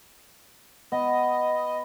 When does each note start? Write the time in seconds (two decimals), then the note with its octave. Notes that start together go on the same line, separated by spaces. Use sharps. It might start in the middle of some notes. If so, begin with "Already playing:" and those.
0.92 B3 D#5